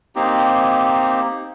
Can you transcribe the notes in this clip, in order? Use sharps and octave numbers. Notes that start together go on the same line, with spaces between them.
A#3 C4 D#4 G4